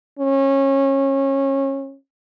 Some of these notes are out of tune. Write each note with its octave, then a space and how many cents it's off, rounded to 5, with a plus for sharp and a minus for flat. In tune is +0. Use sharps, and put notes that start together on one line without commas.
C#4 -25